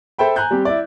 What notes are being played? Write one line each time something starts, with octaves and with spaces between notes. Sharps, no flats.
A4 C5 E5 G5 B5
G#5 A#5 F#6 G6
G3 C4 G4
E4 D5